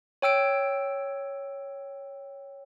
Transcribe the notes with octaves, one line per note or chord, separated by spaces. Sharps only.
C#5 G5 E6 D7